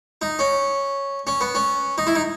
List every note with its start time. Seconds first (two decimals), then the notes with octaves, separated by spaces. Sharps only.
0.22 D#4
0.39 C#4
1.27 C#4
1.41 B3
1.55 C#4
1.98 D#4
2.07 E4
2.15 D#4